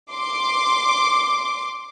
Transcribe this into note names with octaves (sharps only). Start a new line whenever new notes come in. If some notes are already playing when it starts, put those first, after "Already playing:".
C6 D6